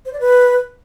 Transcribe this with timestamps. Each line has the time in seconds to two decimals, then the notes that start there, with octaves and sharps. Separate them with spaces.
0.06 C5
0.13 D5
0.20 B4